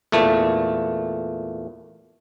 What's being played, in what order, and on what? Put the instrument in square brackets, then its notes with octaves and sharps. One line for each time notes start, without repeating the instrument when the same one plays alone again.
[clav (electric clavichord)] E2 A#2 A3